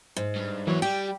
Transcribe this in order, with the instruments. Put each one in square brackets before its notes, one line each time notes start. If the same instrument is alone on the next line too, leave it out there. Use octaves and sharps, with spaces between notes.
[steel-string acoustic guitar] G#2
[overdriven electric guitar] G2
[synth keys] E3 F#3 [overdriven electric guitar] A#3 C#5
[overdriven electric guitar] G3 [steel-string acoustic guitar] G4 [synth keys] G5